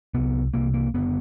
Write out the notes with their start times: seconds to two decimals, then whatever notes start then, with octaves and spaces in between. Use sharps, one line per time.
0.14 C2 C3 B3
0.54 C2 C3 A#3
0.74 A#3
0.94 F#1 D3 B3